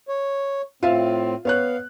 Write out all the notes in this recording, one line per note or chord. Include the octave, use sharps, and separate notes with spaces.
C#5
A2 C4 F4 E5 F5
B3 C#5 F5 F#6